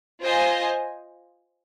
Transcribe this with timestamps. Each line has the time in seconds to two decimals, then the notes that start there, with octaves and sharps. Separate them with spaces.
0.21 F4 C5 D#5 G#5